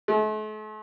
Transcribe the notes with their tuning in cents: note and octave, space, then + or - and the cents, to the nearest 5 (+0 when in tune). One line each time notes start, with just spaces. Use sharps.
A3 -45